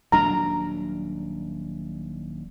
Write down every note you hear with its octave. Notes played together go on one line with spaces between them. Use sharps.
D#1 F#3 D4 A#5